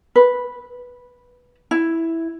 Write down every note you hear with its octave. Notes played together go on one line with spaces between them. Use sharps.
B4
E4